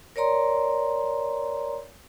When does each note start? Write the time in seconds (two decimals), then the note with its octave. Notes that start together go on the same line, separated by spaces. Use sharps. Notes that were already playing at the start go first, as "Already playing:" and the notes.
0.16 A#4 C#5 D5 A#5 C6